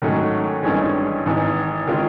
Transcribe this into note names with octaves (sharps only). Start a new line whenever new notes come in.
G#2 D#3 F#3 A3 C#4
G#1 G2 E3 G#3 C#4
G#1 G#2 E3
D#3 G#3 C#4 F4